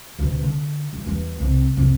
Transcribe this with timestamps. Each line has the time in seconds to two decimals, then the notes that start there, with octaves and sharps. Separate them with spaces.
0.19 D2 B2
0.43 D3
0.93 E1
1.06 E2 G3
1.40 C2 C3
1.77 C2 F2